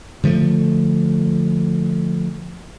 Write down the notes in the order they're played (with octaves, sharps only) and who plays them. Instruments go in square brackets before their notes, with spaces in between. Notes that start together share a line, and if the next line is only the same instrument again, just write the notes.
[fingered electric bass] D3 F3 G#3 A3